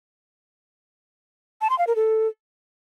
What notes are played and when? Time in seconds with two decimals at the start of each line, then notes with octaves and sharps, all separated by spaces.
1.61 A5
1.70 C6
1.79 F5
1.87 A#4
1.96 A4